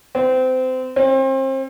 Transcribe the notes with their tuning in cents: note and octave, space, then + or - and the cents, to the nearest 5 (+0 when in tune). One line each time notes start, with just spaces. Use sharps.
C4 -25
C4 +35